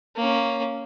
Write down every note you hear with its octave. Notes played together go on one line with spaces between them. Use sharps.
A#3 C#4